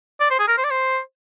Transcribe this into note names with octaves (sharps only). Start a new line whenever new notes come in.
D5
C5
G#4
A#4
C5
D5
C5